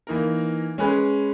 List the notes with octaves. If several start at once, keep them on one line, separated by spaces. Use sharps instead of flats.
E3 A#3 D#4 A#4
G#3 C#4 G#4 B4